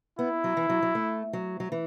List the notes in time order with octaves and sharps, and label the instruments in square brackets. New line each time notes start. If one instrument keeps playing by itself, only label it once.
[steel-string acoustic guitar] B3 [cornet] E4
[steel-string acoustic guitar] F#3
E3
F#3
F#3
A3
F#3
F#3
E3